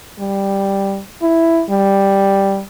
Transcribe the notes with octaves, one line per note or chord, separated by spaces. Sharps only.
G3
E4
G3